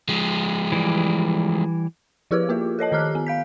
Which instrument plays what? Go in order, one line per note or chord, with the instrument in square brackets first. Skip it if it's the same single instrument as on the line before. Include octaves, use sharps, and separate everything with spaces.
[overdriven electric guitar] F3 G#3
[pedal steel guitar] E3 G3
[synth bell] F3 E4 G4 G#4 B4 D6
A#3 F4 A#4
A4 C#5 D#5 A5
D#3 G4 A#5 D6 F6 F#6
B3
F5 G6 B6